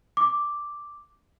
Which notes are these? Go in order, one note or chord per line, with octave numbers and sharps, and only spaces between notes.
D6